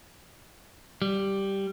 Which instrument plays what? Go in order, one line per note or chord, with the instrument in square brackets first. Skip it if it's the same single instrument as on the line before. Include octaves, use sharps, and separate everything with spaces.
[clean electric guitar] G3